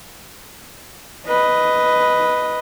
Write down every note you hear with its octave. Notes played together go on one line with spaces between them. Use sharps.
B4 D#5